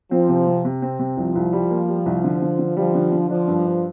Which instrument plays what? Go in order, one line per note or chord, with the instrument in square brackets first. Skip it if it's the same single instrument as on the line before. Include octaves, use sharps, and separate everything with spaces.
[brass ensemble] F3 [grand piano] C4
[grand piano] C3
C3
C3
C4
C3
[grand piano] C2 [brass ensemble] F3
[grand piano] C2
G3
A#3
G3
C2
D3
D3
D3
[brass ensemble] F3 [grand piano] G3
[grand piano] D3
D3
[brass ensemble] F3 [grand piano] D4
[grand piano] G2
D4